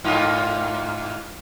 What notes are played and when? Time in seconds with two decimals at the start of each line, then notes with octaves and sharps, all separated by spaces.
0.04 G#2 D#4 F4